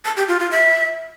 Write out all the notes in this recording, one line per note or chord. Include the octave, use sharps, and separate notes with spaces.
A5
G4
F4
F4
E5